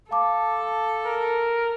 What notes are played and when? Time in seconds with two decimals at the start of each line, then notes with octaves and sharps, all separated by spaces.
0.11 A4 F5 A5 D6
1.06 A#4